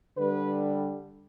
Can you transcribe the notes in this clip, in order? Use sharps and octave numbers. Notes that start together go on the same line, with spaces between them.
D3 G3 B4